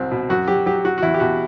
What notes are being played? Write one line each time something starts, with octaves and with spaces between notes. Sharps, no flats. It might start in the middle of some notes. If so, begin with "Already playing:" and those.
Already playing: C2 F#3 C4
B2
F#2 F#4
F#3 G4
F#3 G4
F#3 F#4
F#4
E2 E4
G4
B2 F#4